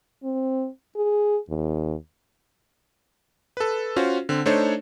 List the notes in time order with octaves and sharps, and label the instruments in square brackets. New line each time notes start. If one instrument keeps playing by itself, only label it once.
[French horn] C4
G#4
D#2
[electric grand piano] A4 B4
C#4 F4 F#4 C5
D3 C4
A3 D4 D#4 A4 C5 C#5